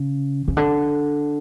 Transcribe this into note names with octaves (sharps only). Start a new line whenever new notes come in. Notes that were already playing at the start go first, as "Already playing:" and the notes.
Already playing: C#3
C#3
D3